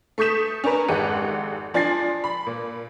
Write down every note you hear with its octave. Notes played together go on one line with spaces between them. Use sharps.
A3 C#6 D#6 G6 B6 E7
C#4 D4 A#4 B4
G#1 F2 G#3 G4 F#5 D#7
F3 D4 G#5 A6 C7
B5
A#2